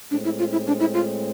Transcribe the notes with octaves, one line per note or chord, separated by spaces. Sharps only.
A2 G#3 C4 D4
E4
F4
E4
D4
E4
F4